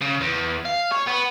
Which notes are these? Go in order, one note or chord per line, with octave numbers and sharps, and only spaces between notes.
C#3
E2
F5
C#5
B3